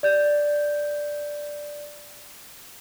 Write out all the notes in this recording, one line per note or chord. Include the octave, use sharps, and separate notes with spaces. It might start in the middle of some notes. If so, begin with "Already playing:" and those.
D5 G6